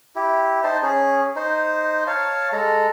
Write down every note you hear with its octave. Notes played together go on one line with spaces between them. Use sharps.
E4 G4
D#4 C5 A5
C#4 G#4
D#4 C5
C#5 F5 A5
G#3 A4 A#5